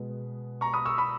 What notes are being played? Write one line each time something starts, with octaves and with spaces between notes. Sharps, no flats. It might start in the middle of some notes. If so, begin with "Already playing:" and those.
Already playing: B2 G#3 B3
A#5 C#6
B5 D#6
C#6 E6
B5 D#6